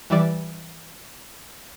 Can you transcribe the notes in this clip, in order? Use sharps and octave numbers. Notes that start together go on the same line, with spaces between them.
E3 G3 E4 D5